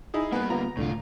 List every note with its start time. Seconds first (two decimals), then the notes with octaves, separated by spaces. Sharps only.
0.14 D#4 E4 G#4
0.32 G3 A#3 B3 B4
0.50 D3 B3 F4 A#5
0.77 C2 A2 D3 F4